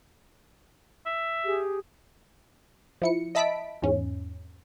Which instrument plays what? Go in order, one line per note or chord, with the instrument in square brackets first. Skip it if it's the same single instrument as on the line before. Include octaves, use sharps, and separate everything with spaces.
[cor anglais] E5
[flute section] G4 G#4
[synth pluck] F3 E4 C#7
D#5 E5 A5 B5 B6 D7
E2 G#2 C#4